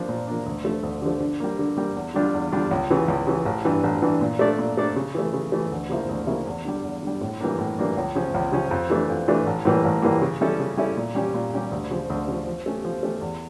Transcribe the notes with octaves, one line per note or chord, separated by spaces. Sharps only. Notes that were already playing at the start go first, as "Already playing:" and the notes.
Already playing: F3 A#3 D4
A#2
F3 A#3 D4
D2
D3 F3 A3
D2
D3 F3 A3
D3
G3 A#3
D3
G3 A#3
E2
D3 G3 D4 F4
E2
D3 G3 D4 F4
C#2
C#3 E3
C#2
C#3 E3
A1
G2 E3
A1
G2 E3
A#2
A3 D4 A4 D5
A#2
A3 D4 A4 D5
C#3
E3 A3
C#3
E3 A3
D2
C#3 F3 A#3 E4
D2
C#3 F3 A#3 E4
E2
D3 G3
E2
D3 G3
A2
E3 G3 A#3 D4
A2
E3 G3 A#3 D4
C#2
C#3 F3 C#4
C#2
C#3 F3 C#4
F2
E3 A3 D4
F2
E3 A3 D4
A1
A2 E3 G3 A#3
A1
A2 E3 G3 A#3
C#3
G3 C#4 E4 A4
C#3
G3 C#4 E4 A4
A#2
G3 C#4 G4
A#2
G3 C#4 G4
D2
C#3 F3
D2
C#3 F3
F3
A3 C#4 G4
F3
A3 C#4 G4
E2